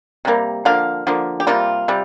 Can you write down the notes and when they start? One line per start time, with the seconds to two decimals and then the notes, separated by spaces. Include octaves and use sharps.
0.25 C3 G3 A#3
0.65 D3 F3 A#3 F5
1.07 D3 F3 A#3
1.40 G4
1.47 C3 G3 A#3 F4
1.88 C3 G3